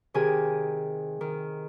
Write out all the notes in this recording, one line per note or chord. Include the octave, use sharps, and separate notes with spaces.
C3 D#3 G4 G#4 G#5
D#3